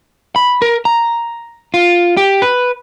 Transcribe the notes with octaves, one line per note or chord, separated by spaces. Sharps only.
B5
A#4
A#5
F4
G4
B4